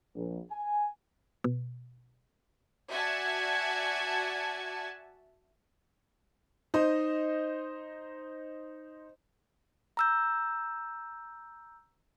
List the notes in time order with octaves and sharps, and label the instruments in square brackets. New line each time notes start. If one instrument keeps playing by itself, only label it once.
[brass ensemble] A#1
G#5
[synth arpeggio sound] B2
[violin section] F#4 D5 E5 G#5 A5 G#6
[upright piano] D#4 C5 D#5
[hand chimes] A#5 E6 G6